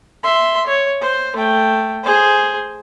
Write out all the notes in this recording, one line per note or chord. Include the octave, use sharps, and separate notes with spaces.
E5 C6
C#5
C5
A3 G5
G#4 C5